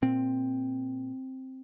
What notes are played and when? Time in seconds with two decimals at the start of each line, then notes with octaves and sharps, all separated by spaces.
0.02 A#2 C4